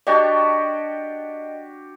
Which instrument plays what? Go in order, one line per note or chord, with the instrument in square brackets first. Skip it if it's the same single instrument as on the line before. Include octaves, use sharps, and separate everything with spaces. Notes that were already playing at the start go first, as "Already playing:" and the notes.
[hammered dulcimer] D4 F#4 G4 [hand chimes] D5 D#5 G5